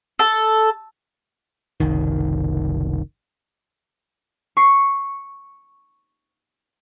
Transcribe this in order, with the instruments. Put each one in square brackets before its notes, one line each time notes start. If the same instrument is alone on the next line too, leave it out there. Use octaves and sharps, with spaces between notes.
[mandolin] A4
[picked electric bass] F#1 C2 D#3
[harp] C#6 C7